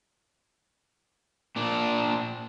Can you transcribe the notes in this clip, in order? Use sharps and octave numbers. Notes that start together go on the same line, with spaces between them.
A#2 D4